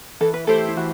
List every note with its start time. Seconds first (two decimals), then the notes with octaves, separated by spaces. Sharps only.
0.21 E3 A4
0.34 B4
0.47 A3 E4 G4 A4 C5
0.68 E4
0.77 E3 F#4